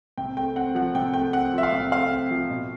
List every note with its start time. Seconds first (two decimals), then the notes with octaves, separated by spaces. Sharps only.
0.18 C3 G5
0.37 A3 G5
0.56 C4 F#5
0.75 F3 F#5
0.95 C3 G5
1.14 A3 G5
1.33 C4 F#5
1.53 F3 E5
1.63 F5
1.72 C3
1.91 A3 F5
2.11 C4
2.31 F3
2.50 B2